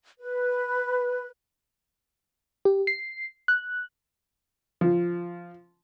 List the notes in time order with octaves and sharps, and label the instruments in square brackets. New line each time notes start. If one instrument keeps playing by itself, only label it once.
[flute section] B4
[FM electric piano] G4
C7
F#6
[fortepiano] F3